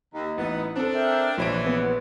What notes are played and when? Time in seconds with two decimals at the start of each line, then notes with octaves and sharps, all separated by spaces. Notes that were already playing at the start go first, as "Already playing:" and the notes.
0.14 D#2 D#4
0.38 A1 B3
0.76 C4 D4 A4
0.95 A#4 E5 G5
1.38 A#1 C3 E3 C#5 D7
1.66 B3